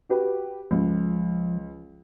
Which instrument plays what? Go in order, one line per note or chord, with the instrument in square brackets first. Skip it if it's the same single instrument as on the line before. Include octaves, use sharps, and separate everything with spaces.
[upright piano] F#4 G4 B4
[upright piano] C#2 [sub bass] F3